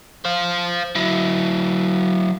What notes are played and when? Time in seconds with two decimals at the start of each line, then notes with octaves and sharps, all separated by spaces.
0.25 C5 F5
0.95 F#3 E4